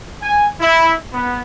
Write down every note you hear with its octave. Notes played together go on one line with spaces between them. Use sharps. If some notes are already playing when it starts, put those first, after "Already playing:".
G#5
E4
B3